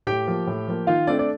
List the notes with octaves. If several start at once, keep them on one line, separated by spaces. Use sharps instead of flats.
A2 G4 G5
F3 A#3
A2
F3 A#3
D#3 F4 F5
A3 C4 D4 D5
D5